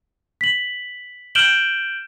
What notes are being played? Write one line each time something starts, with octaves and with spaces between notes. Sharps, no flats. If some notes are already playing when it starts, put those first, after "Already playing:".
B6 F#7
F6 G6 D7 E7 F#7 G7